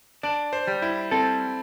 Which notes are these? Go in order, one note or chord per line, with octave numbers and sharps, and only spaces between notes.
D4 D5
C5
G3
E4
C4 A4